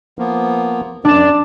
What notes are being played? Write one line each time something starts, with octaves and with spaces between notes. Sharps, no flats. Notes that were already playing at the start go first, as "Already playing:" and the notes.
F3 A#3 B3
F#2 D4 D5 E7